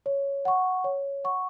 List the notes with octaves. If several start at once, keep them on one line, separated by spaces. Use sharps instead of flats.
C#5
F#5 C#6
C#5
F#5 C#6